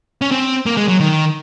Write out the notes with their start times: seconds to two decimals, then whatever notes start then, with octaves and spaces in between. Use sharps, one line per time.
0.22 C#4
0.31 C4
0.66 A#3
0.77 G#3
0.88 F#3
1.00 D#3